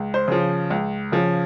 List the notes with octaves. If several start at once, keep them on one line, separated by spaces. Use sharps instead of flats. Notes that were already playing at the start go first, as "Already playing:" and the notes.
Already playing: C#2
C5
C#3 F3
C#2
C#3 F3